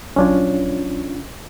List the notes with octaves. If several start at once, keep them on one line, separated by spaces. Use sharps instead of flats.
A#1 F#3 C#4 D4 F4 C#5